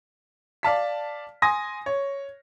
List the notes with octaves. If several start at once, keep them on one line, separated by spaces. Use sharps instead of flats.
D5 F5 A5 B6
G#5 C6 D#6 A#6
C#5